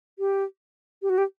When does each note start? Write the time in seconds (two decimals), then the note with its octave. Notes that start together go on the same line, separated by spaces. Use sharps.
0.19 G4
1.02 G4
1.10 F#4
1.18 G4